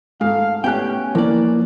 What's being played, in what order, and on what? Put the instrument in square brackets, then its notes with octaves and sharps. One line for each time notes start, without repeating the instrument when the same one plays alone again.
[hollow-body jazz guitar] G#2 [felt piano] A3 A4 [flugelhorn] F5
[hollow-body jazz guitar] A2 G4 G5 [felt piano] B3 G#5 F#6 [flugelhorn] C#4
[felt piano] E3 [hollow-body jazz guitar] F3 D5 [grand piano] A#3